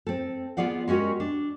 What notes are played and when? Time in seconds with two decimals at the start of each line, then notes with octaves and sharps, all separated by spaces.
0.07 C4 A4
0.57 B3 F4 G#4 D5 F5 F#5
0.88 G#3 C#4 F#4 G4 A#4
1.20 D4